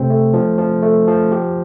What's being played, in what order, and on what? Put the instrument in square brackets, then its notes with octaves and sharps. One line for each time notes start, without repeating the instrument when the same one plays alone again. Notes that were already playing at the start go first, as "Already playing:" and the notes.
Already playing: [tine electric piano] C3 A3 C4
A3
F3
F3
A3
F3
G4